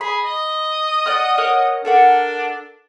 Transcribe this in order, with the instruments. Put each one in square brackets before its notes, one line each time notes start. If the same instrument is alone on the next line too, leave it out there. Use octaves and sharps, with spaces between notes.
[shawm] G#4 [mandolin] B5
[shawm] D#5
[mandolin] D5 F#5 F6
A#4 C#5 F#5
[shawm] D4 [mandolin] A4 A#4 F#5